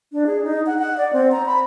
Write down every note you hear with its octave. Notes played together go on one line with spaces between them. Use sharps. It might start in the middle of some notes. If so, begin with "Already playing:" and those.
D4
G#4
D#4
F#5
F#5
D5
C4
A#5
B5